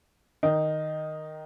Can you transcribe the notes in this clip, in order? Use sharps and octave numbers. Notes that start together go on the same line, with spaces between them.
D#3 D#4